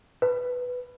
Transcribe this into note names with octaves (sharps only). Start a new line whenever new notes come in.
B4